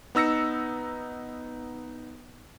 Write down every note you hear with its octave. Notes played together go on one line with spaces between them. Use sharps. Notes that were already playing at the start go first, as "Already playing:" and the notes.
B3 D#4 E6 A#6 C#7